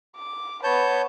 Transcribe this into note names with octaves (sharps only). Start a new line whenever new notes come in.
D6
B3 B4 C#5 A5 G6